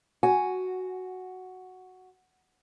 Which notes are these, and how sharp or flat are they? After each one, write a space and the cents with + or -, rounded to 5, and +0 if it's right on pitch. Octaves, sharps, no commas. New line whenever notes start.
F#4 +0 G#5 +0